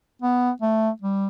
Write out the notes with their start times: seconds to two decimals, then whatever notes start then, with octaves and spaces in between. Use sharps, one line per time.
0.22 B3
0.62 A3
1.02 G3